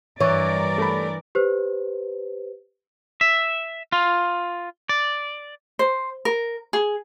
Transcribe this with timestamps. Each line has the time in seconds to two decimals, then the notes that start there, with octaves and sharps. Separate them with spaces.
0.21 G2 E3 A#4 C#5 D5 C#6
0.78 A3 B5
1.35 G4 B4 C5
3.21 E5
3.92 F4
4.89 D5
5.79 C5
6.25 A#4
6.73 G#4